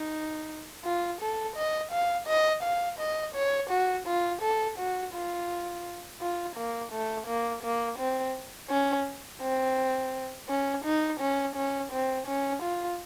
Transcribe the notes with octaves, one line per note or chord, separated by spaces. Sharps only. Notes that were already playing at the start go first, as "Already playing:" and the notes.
Already playing: D#4
F4
A4
D#5
F5
D#5
F5
D#5
C#5
F#4
F4
A4
F#4
F4
F4
A#3
A3
A#3
A#3
C4
C#4
C4
C#4
D#4
C#4
C#4
C4
C#4
F4